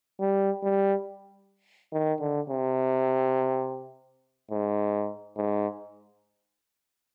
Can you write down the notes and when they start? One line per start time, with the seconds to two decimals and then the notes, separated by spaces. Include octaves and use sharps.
0.20 G3
0.63 G3
1.93 D#3
2.20 D3
2.50 C3
4.51 G#2
5.37 G#2